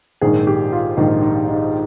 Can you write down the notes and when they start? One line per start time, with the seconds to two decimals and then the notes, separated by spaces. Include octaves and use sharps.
0.21 A#1 G#2 D#3 G#4
0.47 G4
0.72 F4
0.97 A#1 G#2 D#3 D#4
1.22 D#4
1.48 D#4